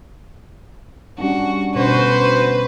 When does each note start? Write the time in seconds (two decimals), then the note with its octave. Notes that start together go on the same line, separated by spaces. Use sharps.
1.18 G3 C#4 D4 F#4
1.75 B2 D3 C#4 F#4 B4 C5